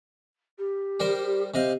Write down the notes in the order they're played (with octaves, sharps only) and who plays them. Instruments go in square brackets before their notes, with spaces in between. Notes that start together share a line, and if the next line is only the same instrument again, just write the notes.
[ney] G4
[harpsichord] G3 A#4 C5
[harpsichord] C3 D#5 F5 [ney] C5